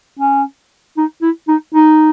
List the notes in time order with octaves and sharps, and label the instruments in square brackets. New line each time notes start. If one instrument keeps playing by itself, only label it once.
[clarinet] C#4
D#4
E4
D#4
D#4